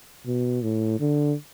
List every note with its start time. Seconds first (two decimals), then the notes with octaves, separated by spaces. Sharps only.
0.26 B2
0.62 A2
1.00 D3